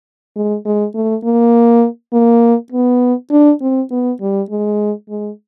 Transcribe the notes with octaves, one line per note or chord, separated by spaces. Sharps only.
G#3
G#3
A3
A#3
A#3
B3
D4
C4
B3
G3
G#3
G#3